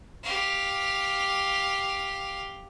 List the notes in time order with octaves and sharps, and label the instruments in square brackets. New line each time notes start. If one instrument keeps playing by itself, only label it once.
[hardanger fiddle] G4 F5